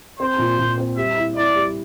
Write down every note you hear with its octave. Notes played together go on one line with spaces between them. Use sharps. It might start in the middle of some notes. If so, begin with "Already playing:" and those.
C4 C5
A#2
A#2
C4
G3 E5
E4
E4 D5
G3